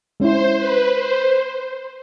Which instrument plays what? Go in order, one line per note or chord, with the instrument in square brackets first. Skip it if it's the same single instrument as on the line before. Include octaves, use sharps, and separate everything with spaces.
[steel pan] G#3 C#4 E4 [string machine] C5
[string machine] B4
C5